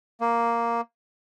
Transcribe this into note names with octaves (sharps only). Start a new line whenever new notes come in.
A#3